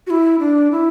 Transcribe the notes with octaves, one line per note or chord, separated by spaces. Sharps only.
F#4
E4
D4
E4